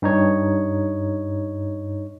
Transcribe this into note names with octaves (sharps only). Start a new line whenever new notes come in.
G2 D#4 C#5